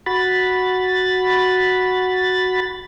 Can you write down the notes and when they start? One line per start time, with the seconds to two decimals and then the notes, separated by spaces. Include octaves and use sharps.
0.06 F#4 B5 A6